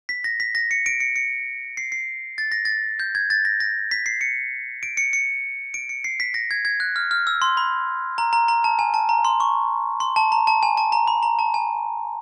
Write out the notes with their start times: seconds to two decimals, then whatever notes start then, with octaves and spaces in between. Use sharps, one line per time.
0.09 B6
0.24 A#6
0.40 B6
0.55 A#6
0.71 C#7
0.86 D7
1.00 C#7
1.16 C#7
1.77 C7
1.92 C7
2.38 A6
2.52 A#6
2.65 A6
3.00 G6
3.15 G#6
3.30 A6
3.45 A#6
3.60 A#6
3.91 B6
4.06 C7
4.21 C#7
4.83 D7
4.97 C#7
5.13 C#7
5.74 D7
5.89 C#7
6.04 C7
6.20 B6
6.34 A#6
6.51 G#6
6.65 G#6
6.80 F#6
6.96 F6
7.11 F6
7.27 E6
7.42 C6
7.57 B5
8.18 A#5
8.33 A#5
8.48 A#5
8.64 A5
8.79 G#5
8.94 A5
9.09 A#5
9.25 C6
9.40 C#6
10.00 C6
10.16 A5
10.32 A#5
10.47 A5
10.63 G#5
10.77 A5
10.92 A#5
11.08 B5
11.23 A#5
11.39 A5
11.54 G#5